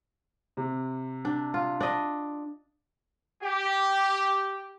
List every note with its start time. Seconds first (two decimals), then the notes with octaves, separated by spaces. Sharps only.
0.57 C3
1.25 D4
1.54 F4
1.81 D4 D#5
3.43 G4